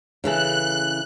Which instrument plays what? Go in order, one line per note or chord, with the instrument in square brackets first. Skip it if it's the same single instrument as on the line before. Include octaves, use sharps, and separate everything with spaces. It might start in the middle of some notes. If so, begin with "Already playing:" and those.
[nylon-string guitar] C#3 E3 A4 [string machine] F#6